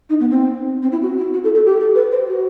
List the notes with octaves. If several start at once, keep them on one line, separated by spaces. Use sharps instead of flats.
D#4
B3
C4
C4
E4
F#4
E4
F#4
A4
A4
G4
A4
B4
C5
F#4